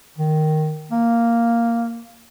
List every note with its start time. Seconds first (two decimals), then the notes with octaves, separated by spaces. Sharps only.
0.18 D#3
0.92 A#3